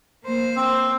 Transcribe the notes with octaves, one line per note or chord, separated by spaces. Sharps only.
A#3 C5
C4